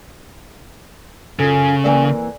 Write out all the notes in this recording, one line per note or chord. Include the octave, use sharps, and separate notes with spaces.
F#2 C#3 F4 A4
E3 A#3 C4 D5 G#5